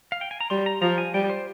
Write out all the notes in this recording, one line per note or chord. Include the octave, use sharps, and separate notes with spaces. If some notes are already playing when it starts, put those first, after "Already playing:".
F5
G5
G#5
A#5
G3 C6
A#5
F3 A#5
G#5
G3 G5
C5